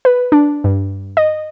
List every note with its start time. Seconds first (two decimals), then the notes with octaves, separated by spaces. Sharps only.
0.05 B4
0.32 D4
0.64 G2
1.17 D#5